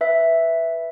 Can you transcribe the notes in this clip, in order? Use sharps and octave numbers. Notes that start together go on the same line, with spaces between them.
B4 E5